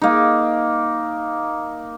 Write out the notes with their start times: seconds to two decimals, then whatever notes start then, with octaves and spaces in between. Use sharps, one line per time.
0.02 A#3 D#4